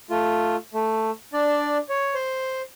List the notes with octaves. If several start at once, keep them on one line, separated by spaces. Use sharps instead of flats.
A3 F4
A3
D4 D5
C#5
C5